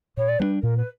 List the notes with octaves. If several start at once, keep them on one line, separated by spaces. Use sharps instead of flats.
A#2 C#5
D5
G3 B3 D4 B4
A#2 A#4
B4